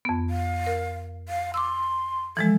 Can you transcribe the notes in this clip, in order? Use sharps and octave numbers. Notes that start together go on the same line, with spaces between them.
F2 B3
F5
A#4
F5
C6 D6 E6
E3 F3 G#3 A4